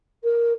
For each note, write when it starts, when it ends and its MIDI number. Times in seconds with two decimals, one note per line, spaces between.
0.24 0.53 70